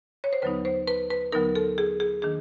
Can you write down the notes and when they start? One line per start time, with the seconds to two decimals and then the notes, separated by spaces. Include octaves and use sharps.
0.24 C#5
0.33 C5
0.42 D#2 D3 F#3 B3 D#4 B4
0.65 C5
0.88 B4
1.10 B4
1.32 D#2 D3 F#3 B3 D#4 A#4
1.55 A4
1.78 G#4
2.00 G#4
2.22 D#3 F#3 A#3 D4 G#4